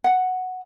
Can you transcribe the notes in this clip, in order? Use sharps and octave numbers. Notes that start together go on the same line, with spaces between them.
F#5